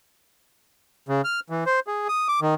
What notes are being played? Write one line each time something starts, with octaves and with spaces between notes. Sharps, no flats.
C#3
F6
E3
C5
G#4
D#6
D6
D#3